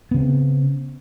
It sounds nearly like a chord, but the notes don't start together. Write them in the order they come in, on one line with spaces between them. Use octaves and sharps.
B3 C#3 C4